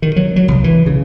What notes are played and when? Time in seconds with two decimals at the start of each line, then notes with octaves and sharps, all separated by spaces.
0.02 D#3
0.16 F#3
0.36 F#3
0.48 C2
0.64 E3
0.86 C#3